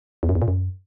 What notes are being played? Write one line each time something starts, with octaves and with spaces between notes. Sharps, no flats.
E2
F#2
E2
A#2
F#2